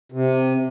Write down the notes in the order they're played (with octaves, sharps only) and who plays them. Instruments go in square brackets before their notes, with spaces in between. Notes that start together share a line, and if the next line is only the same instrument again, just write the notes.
[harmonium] C3